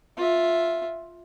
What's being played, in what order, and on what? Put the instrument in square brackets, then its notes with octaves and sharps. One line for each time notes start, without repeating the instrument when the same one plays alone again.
[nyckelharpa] F4 E5